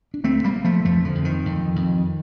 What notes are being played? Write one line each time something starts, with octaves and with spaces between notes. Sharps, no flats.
D4
D2 A3 C4
G3 A#3
D2
F3 A3
F2 F3 A3
D3 F3
F2
D#3
F2
F2